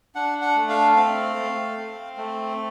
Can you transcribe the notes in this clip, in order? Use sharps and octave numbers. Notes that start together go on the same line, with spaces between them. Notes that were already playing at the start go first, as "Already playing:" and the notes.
D4 F#5
F#5
A3
F5
C4 F5
A3
C4
A3